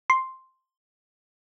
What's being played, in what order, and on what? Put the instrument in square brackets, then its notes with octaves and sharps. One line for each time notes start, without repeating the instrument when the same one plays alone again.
[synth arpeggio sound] C6